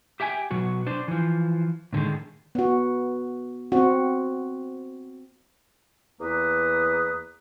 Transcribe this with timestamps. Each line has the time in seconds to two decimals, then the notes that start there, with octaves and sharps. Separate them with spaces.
0.20 G4 E5 G5 G#5
0.51 B2 F#3 F#4
0.87 D4 C5
1.08 E3 F3
1.93 A2 D3 D#3 G#3
2.55 B3 F#4
3.72 C4 F#4
6.21 E2 A#3 B4 D#6